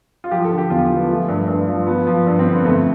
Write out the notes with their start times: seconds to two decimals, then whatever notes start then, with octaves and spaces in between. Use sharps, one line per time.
0.24 F4
0.31 F3 G4
0.44 A4
0.50 D3
0.58 G4
0.70 E2 F4
0.84 G4
0.90 F3
0.96 B3
1.09 F3 A3
1.28 G2
1.48 G2
1.68 F3
1.87 F3 B3
2.07 F3
2.27 G2
2.39 C4
2.46 D3
2.52 B3
2.65 F2 A3